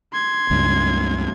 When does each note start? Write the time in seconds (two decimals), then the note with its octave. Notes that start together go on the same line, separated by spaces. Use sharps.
0.13 C6 G#6
0.50 C#2 G2 C#3